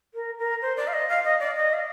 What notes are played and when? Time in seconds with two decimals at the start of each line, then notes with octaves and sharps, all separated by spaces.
0.14 A#4
0.38 A#4
0.62 C5
0.77 D5
0.87 F5
0.93 D#5
1.09 F5
1.25 D#5
1.40 D5
1.56 D#5
1.73 F5